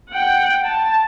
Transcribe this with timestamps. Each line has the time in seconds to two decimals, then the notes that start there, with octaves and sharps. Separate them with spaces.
0.10 F#5 G5
0.65 A5